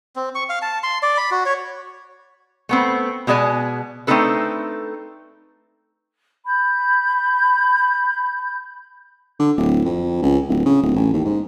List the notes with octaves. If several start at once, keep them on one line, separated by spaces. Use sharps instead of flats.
C4
C#6
F5
A5
C6
D5
B5
F#4
C#5
A3 B3 C4
B2 G#3 G#4 D5 A5
A3 C4 D4 D#4 A4 B4
B5 G6
D3
D1
F2
C#2
D1
C#3
D1
A1
D#2
G#2